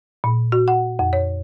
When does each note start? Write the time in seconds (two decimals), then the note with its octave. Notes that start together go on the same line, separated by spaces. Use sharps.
0.24 A#2
0.52 F#4
0.68 F#5
0.99 F2
1.13 C#5